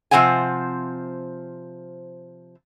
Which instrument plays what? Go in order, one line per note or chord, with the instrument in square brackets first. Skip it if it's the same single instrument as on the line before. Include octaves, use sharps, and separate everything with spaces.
[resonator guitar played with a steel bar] C3 F3 C4 C5 F#5 G#5